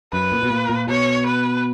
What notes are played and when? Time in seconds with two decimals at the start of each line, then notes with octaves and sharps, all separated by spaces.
0.12 F#2 B4
0.32 A#2
0.43 B2
0.51 A#2
0.70 A#2
0.88 B2 C#5
1.26 B4